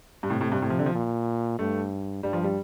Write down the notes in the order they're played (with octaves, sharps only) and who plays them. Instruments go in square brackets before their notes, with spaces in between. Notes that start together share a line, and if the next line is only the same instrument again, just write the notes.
[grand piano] G2
[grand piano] A2 [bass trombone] C3
[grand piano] A2
G2
A2
F3
D3
F3
[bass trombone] A#2
[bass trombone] G2 [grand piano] A3
[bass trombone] G2 [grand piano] G3
[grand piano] F3
G3